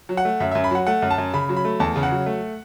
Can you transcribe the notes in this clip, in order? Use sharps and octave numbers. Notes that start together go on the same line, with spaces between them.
F#3
F#5
A3
F#2 E5
F#2 E5
B5
F#3 F#5
A3 F#5
F#2
A5
F#2
C#3 B5
F#3
B5
A3
E2 A5
C#3
F#5
F#3
A3